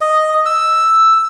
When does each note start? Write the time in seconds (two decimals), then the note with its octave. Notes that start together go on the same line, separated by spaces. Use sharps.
0.01 D#5
0.46 E6